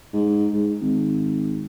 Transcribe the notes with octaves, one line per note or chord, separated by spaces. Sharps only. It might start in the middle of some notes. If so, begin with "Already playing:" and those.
G#2
G#2
G#1